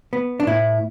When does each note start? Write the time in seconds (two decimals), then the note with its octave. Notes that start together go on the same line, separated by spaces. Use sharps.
0.13 B3
0.40 D4
0.47 A2 E4